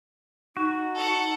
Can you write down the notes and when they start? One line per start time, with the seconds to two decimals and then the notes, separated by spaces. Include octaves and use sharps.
0.57 D#4 F#4
0.95 A4 F#5